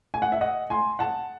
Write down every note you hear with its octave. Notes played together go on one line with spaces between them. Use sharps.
G#5
F#5
E5
D#5 F#5
G#5 C6
F#5 A5